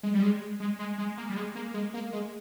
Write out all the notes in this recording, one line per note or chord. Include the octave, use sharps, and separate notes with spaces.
G#3
G3
G#3
G#3
G#3
G#3
A#3
G3
G#3
A#3
G#3
A#3
G#3